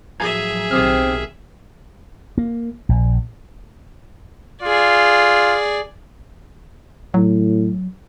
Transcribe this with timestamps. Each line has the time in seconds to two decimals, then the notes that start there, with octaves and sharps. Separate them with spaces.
0.20 A2 F3 F#3 G#4 E5 G#5 A#5 G#6
0.71 B1 D#3 C4 G4 D#6 F6
2.38 A#3
2.89 A#1
4.63 F4 G#4 D5
7.14 A2 F#3